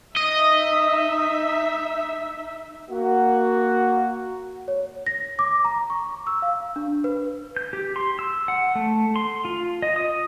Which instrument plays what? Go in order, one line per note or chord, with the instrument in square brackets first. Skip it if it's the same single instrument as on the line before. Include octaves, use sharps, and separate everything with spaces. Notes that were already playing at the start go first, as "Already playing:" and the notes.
[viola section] D#4 E5 [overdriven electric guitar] D#5
[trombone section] A#3 F#4
[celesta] C#5
A#6
D6
A#5
C#6
E6
F5
D4
B4
[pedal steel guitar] G6
G4
C6
E6
F#5
A3
C6
F4
D#5
D#6